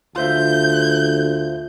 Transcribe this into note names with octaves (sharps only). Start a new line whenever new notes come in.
D2 F4 C5 E5 G6